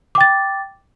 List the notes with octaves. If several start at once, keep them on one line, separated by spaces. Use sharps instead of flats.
G5 D6 A6